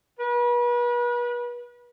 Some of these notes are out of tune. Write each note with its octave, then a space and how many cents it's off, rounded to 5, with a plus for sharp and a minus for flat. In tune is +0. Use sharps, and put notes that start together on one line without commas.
B4 -35